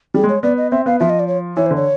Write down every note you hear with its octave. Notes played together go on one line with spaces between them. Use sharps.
G3 G#4
G#3
C#5
B3 D5
D#5
C4 E5
B3 F5
F3 E5
D#5
D5
C#5
E3 C#5
C5
D3
C#5